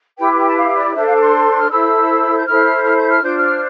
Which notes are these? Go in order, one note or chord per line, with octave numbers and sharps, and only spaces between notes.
E4 G4 B4 G5
G5
A5
F5
D5
D4 A4 C5 E5
F5
D6
C6
F6
E4 A4 C5 E6
G6
E4 A4 C5 F6
F6
G6
F6
D4 F4 C5 G6
F6